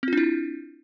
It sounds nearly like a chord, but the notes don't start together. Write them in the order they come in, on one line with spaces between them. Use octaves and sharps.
C4 F4 D4 E4